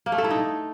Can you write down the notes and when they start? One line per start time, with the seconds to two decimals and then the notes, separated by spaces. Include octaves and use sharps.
0.06 A#3
0.12 A3
0.18 A4
0.24 E4
0.30 D#4